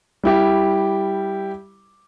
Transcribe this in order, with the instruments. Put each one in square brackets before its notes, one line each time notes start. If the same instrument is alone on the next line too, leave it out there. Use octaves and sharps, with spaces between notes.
[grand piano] G3 E4 G4